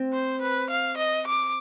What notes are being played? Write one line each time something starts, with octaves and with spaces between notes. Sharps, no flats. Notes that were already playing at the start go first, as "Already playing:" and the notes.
Already playing: C4
C5
B4
F5
D#5
D6